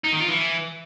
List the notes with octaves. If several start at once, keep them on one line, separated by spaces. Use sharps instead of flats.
D#4
D#3
F4
E3